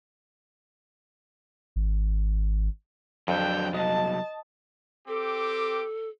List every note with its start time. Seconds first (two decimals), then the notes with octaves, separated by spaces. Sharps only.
1.76 G#1
3.28 F2 D3 F#3 D4 G5
3.74 C2 F#3 D#5 A5
5.08 C4 G4 A4 D6